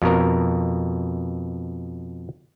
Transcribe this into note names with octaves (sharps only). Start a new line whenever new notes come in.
F2 B2 A#4